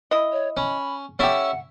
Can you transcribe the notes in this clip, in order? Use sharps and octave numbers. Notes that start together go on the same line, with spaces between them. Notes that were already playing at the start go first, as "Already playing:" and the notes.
E4 D#5
C#5
C#4 B5
C#4 E4 G4 A4 E5 F#5